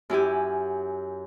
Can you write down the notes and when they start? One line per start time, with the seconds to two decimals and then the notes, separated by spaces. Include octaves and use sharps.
0.10 F#2 E4 G4 G#5